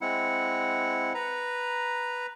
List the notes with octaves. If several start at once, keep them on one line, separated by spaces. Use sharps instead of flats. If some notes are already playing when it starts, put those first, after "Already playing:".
G#3 C4 E4 F#5
B4 A#5